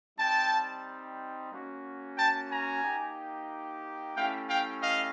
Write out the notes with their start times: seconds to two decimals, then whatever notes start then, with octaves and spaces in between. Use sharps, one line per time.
0.18 G3 C4 D#4 G5 A5
1.51 A#3 C#4 F#4
2.17 G5 A5
2.50 G#5 A#5
2.83 A#3 D#4 G4
4.15 A3 C#4 E4 G4 F5 G5
4.48 F5 G5
4.81 D#5 F5